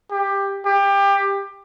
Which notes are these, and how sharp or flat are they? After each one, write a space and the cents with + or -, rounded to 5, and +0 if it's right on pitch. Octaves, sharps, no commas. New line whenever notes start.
G4 +15
G4 +20